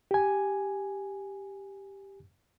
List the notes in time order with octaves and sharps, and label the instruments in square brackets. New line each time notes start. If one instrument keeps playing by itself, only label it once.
[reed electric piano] G4 G#5